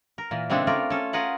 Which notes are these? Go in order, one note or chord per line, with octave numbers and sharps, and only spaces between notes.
A#4
A#2 E3
C#3 G#3 C4 D4 E4 A4
A3 F4 A#4 D5
C#4 A4
F4 G#4 A#4 B4 F#5